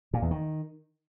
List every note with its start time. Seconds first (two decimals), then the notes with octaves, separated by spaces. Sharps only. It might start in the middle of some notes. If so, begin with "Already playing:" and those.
0.13 A#2
0.22 E2
0.31 D#3